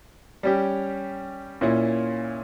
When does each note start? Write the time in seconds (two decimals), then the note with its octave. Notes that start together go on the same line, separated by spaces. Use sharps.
0.43 G3 C#4 G4
1.61 A#2 A#3 C#4 E4